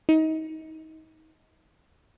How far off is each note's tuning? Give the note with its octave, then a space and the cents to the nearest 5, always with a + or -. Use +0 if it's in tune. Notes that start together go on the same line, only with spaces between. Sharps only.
D#4 +30